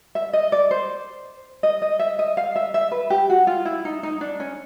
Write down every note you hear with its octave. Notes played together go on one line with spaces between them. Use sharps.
E5
D#5
D5
C5
D#5
D#5
E5
D#5
F5
E5
E5
B4
G4
F#4
F4
E4
D#4
D#4
D4
C#4